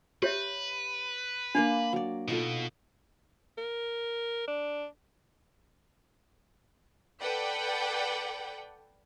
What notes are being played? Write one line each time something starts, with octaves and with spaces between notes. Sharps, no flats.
G4 B4 C#5 E5
A#3 D4 D5 F5
F#3 D5
B2 D#4 F4 A4
A#4
D4
A4 B4 D5 F#5 G5